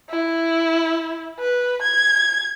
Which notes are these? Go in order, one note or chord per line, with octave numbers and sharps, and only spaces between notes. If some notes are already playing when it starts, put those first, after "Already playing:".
E4
B4
G#6